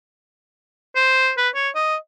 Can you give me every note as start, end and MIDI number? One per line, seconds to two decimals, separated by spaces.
0.96 1.32 72
1.37 1.49 71
1.55 1.69 73
1.75 1.96 75